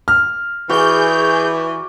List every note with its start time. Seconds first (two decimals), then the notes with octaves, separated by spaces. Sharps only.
0.08 F6
0.69 E3 F#4 G#4 D5 G6